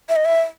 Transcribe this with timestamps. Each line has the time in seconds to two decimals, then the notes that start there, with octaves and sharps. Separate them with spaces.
0.09 E5
0.16 D#5
0.25 E5